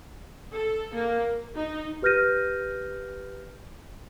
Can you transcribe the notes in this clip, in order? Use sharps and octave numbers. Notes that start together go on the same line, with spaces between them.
A4
A#3
D#4
G4 B4 F6 G6 A#6 D#7